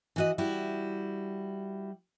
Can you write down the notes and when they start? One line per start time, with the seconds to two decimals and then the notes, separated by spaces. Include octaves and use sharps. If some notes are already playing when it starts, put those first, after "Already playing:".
0.16 E3 F#4 D#5
0.38 G3 E4 F#4